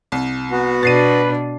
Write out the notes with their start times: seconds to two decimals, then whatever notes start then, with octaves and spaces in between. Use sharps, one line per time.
0.12 C2
0.51 B3 F#4
0.83 B2 D4 B4 A6 C7 D#7